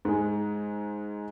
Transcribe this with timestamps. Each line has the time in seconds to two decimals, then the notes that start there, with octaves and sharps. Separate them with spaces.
0.05 G#2 G#3